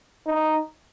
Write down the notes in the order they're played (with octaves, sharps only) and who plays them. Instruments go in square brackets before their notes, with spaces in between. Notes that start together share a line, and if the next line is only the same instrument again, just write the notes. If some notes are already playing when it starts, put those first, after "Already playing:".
[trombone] D#4